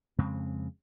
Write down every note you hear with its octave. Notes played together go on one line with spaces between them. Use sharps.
F2 C#3 G#3 C4